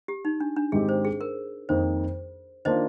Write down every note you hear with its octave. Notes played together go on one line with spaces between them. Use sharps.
G4
D#4
D4
D4
G#2 D#3 G#3 C4 G4 G#4
C5
G#4
A#4
F2 D#3 A#3 D#4 C5
D#3 A#3 D4 F4 C5 D#5